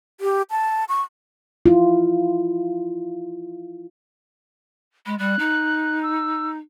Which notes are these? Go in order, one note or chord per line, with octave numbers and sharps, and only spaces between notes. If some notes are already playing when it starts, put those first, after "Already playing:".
G4
A5
C#6
E4 F4
G#3 B5
G3 F#6
D#4
E6